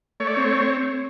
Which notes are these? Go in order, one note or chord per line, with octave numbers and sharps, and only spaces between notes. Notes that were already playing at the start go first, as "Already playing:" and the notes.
A3 C#5
D5
C4 C#5